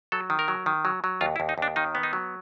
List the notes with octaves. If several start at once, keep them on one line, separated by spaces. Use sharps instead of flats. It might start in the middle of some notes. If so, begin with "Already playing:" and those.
F#3 A4
D#3
A#4
F#3
D#3
F#3
F#3
D#2 F4
E4
D#2
D#4
D#2 D4
D#3 D#4
B3
D#4
F#3